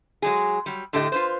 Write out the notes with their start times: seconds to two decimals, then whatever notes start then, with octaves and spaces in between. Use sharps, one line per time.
0.22 F#3 G#3 G#4
0.66 F#3 G3
0.93 A2 D3 G4 A4 D#5
1.12 F4 B4 C5